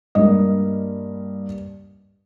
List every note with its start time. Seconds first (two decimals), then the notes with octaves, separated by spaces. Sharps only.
0.15 G2 G3 A#3 D#5